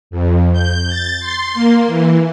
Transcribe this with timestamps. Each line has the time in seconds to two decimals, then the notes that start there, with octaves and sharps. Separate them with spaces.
0.11 F2
0.53 G6
0.89 A6
1.20 C6
1.54 A#3
1.87 E3